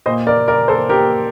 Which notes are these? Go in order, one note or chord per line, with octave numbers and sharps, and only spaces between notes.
A#2 C5 D#5
A#4 D5
A#4 D5
A4 C5
G4 A#4